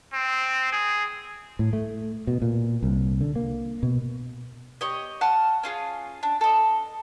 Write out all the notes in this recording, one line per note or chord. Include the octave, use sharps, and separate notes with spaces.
C4
G#4
A2
A3
B2
A#2
C2
D3
A#3
B2
G4 C#5 D#5
F#5 A5 F6
C#4 F4 G#4
D4
A4 D#5